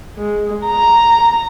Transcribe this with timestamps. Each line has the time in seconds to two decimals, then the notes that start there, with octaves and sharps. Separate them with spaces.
0.18 G#3
0.67 A#5